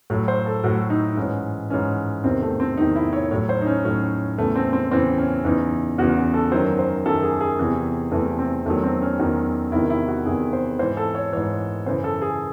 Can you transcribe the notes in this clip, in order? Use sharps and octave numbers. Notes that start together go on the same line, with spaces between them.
A2 F#3
C5
A4
A2 F#3 F#4
D#4
G#2 E3 C#4
G#2 E3 C#4
E2 C3 D#3 C4
A3
C4
E2 C3 D#3 D#4
E4
C#5
A2 F#3 C#5
C5
D#4
C#4
A2 F#3 C#4
E2 C#3 E3 A3
C4
C4
E2 C#3 E3 C4
C#4
E2 C#3 E3 D#4
E2 C#3 E3 F#4
A4
F#2 D#3 F#3 C5
C5
F#2 D#3 F#3 A4
G#4
G#4
E2 C3 E3
E2 C3 E3 A3
C4
E2 D#3 F#3 A3
C4
C#4
E2 D#3 F#3
E2 C3 D#3 E4
E4
F#4
E2 C3 D#3 G#4
C5
G#2 E3 C5
A4
C#5
G#2 E3 C#5
F#2 C#3 E3 C5
A4
G#4